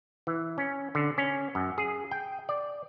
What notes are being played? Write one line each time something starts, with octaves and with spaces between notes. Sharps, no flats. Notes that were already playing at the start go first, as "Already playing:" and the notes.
E3
C#4
D3
C#4
F#2
G#4
G5
D5